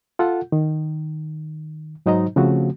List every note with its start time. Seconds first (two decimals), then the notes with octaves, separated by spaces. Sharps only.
0.19 F4 A4 F#5
0.52 D#3
2.06 G#2 F#3 D#4 C5 D#5 A#5
2.36 C#3 F3 A3 C4 F#4